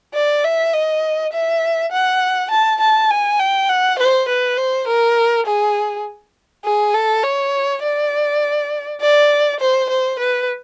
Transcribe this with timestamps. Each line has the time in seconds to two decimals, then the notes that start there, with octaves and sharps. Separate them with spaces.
0.14 D5
0.44 E5
0.74 D#5
1.33 E5
1.92 F#5
2.51 A5
2.81 A5
3.10 G#5
3.40 G5
3.69 F#5
3.99 C5
4.28 B4
4.58 C5
4.87 A#4
5.46 G#4
6.65 G#4
6.94 A4
7.24 C#5
7.83 D5
9.01 D5
9.60 C5
9.90 C5
10.19 B4